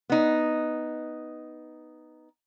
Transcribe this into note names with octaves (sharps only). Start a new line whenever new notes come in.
B3 D#4